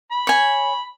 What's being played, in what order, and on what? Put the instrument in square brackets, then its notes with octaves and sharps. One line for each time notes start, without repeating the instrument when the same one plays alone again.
[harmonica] B5
[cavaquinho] C#5 G#5